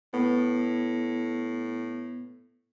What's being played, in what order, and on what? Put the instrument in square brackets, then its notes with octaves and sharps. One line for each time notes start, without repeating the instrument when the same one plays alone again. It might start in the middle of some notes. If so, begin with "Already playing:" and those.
[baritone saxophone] A2 [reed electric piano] B3